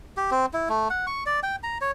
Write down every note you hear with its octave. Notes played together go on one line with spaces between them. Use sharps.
G4
C4
E4
A3
F#5
C#6
D5
G5
A#5
C#5